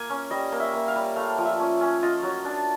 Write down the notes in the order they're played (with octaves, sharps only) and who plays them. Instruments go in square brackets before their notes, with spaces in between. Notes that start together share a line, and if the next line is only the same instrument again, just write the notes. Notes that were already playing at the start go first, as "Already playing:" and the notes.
Already playing: [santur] A#3 G#5
C#4
G3 D#5
A#3
E5
A#3
F5
G3
A3 F5
F3
E5
C#4
C#4
F4 D#5
F#3
D4